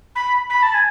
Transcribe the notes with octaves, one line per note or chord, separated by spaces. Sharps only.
B5
B5
A5
G#5